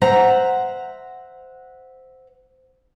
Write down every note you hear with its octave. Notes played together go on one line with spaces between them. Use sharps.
C5 E5 F#5 A#5